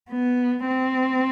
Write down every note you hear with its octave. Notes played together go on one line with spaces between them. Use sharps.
B3
C4